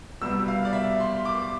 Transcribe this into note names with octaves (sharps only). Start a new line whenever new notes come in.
C2 B2 G3 B3 E6
F5
D5
E5
C6
D6